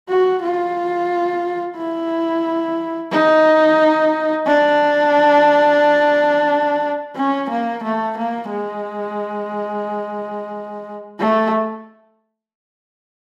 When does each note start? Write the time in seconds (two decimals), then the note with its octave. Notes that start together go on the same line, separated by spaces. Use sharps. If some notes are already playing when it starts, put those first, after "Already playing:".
0.09 F#4
0.42 F4
1.76 E4
3.11 D#4
4.46 D4
7.16 C#4
7.50 A#3
7.83 A3
8.17 A#3
8.50 G#3
11.19 A3